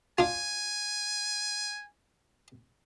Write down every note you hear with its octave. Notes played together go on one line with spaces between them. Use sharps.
D4 F4 G#5